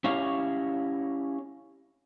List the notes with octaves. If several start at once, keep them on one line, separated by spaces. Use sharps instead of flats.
C#4 E4 G4 C#5 D#5 F5